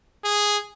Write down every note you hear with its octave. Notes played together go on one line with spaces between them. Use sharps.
G#4